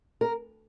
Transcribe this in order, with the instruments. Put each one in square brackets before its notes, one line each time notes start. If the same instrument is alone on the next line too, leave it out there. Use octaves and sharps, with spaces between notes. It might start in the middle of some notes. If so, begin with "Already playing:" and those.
[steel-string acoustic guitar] A#4